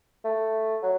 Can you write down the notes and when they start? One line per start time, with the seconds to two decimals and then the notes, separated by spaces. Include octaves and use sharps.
0.24 A3
0.83 F#3